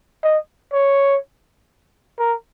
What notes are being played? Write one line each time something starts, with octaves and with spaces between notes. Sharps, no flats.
D#5
C#5
A#4